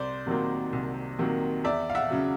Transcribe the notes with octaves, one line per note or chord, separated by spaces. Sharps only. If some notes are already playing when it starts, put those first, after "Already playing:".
Already playing: C2 C5 D5
C3 D#3 F#3 A#3
C2
C3 D#3 F#3 A#3
E2 D5 E5
F5
E5 F#5
C#3 F#3